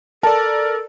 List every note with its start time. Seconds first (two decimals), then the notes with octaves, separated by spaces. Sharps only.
0.23 A4 A#4 D5 A5